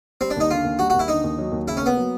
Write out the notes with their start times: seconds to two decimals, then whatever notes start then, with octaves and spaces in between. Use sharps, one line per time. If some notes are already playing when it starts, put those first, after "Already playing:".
0.21 G3 C4
0.30 D4
0.36 D#2 D#4
0.51 D3 F4
0.64 D#2
0.79 G3 F#4
0.90 F#4
0.94 D#2
0.99 E4
1.08 D3 D#4
1.24 D#2
1.39 F#3
1.52 D#2
1.67 C#3 E4
1.77 C#4
1.82 A#3 B3
1.97 F#3